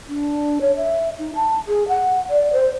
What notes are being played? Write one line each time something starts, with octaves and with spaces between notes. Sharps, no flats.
D4
C#5
E5
D#4
A5
G#4
F#5
D5
C5